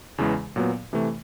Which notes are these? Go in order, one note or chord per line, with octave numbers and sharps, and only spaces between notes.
E2 C#3 E3 G#3
A#2 F#3 B3
C3 E3 A3